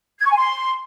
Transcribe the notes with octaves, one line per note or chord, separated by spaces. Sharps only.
G#6
C#6
G#5
C6